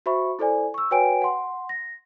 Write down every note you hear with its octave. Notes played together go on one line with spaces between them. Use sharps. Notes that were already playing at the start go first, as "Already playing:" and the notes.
F#4 C5 E5 B5 C#6
E4 A4 C5 D5 G#5
C#6 E6
F#4 B4 C#5 G5 G#5 D7
F#5 C6
A#6